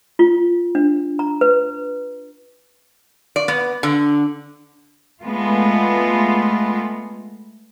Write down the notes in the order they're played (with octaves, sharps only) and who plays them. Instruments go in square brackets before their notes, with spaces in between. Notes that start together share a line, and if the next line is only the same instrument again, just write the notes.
[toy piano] F4
D4
A#5
B4
[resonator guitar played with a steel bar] D5
B3
D3
[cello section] G#3 A3 B3 F4